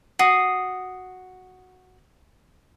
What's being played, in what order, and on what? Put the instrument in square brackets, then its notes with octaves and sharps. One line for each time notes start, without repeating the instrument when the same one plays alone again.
[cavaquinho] F#4 [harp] D#6 C7